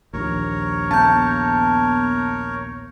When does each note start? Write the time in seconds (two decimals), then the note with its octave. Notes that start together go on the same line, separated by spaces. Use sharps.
0.14 A#1 D#2 A#4 C#5
0.91 B3 A5 G6